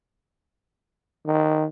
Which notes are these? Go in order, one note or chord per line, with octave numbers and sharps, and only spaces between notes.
D#3